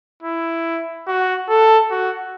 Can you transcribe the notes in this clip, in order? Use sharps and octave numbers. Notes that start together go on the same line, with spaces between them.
E4
F#4
A4
F#4